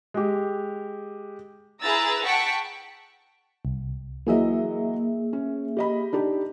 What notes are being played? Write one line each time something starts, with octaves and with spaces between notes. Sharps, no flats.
G#3 G4
E4 G#4 B4 A#5 E6 A6
F#5 G5 A5 C#6 B6 D7
C2
E3 F#3 A#3 G#4 D#5 E5
C#4
G4 D#5 B5
D4 D#4 G4